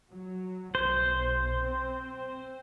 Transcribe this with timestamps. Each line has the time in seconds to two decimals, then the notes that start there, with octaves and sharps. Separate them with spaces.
0.12 F#3
0.75 B1 C5
1.62 C4